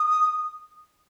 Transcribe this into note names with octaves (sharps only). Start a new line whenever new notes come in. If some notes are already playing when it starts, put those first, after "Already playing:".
Already playing: D#6